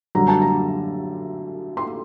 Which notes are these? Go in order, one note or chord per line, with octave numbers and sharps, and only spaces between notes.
F#2 D3 G3 A#5
A5
A#5
C6